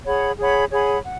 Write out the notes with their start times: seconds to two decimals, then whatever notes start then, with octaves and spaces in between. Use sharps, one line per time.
0.05 G#4 C#5 F#5 B5
0.38 G#4 C#5 F#5 B5
0.71 G#4 C#5 F#5 B5
1.04 F#5